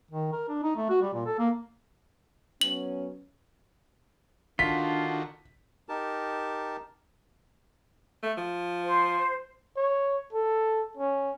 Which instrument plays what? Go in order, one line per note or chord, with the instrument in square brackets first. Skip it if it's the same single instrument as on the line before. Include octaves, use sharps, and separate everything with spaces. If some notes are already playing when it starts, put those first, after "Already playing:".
[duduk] D#3
A#4
D4
D#4
A3
F#4
G3
A#2
A4
A#3
[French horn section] F#3 B3 C#4 [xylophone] F#7
[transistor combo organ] D3 D#3 F#4 [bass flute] D4 [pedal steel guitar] F4 [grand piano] B6
[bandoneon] D#4 G4 A#4 A5
[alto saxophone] A3
F3
[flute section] C5
[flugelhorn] C#5
A4
C#4